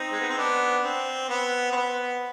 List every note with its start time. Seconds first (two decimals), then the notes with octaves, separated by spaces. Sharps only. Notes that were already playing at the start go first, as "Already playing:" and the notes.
Already playing: C4 D#4
0.12 G#3
0.20 B3
0.29 C4
0.37 B3 D4
0.84 C4
1.29 B3
1.72 C4
1.76 B3